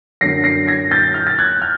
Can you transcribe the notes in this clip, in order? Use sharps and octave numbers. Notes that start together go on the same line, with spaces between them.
F#2 D3 F#3 A#6 C7
A#6 C7
G#6 A#6
G6 A6
F6 G6
A6
F#6 G#6
F6 G6